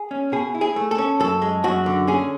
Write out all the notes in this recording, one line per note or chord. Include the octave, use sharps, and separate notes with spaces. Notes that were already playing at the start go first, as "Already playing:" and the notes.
Already playing: G#4
C#4
B2 G#4
E4
G#4
A3
A4
C#4
F#2 A4
G#3
F#2 F#4
D3
C#4 G#4